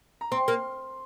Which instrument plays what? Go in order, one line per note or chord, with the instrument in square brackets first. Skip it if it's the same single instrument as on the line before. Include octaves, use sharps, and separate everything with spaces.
[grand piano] A#5
[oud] C4 [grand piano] C6
[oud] A#3